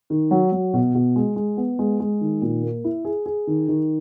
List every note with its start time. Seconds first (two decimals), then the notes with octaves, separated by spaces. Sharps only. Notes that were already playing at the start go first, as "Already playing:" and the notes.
0.10 D#3
0.31 F#3
0.52 F#3
0.73 B2
0.95 B2
1.16 G#3
1.36 G#3
1.57 B3
1.79 G#3
2.00 G#3
2.21 D#3
2.42 A#2
2.62 A#3
2.84 E4
3.05 G#4
3.26 G#4
3.47 D#3
3.68 D#3